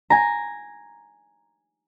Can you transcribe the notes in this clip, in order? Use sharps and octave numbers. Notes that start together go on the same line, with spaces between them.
G#5 A#5